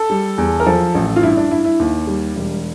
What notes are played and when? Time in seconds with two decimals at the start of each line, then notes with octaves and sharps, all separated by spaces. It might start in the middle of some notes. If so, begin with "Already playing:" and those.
Already playing: A4
0.10 G3
0.38 E2
0.60 A#4
0.66 F3 A4
0.95 A1
1.16 F4
1.23 G2 E4
1.37 D4
1.50 G2 E4
1.65 E4
1.79 D#2
2.07 G3
2.36 E1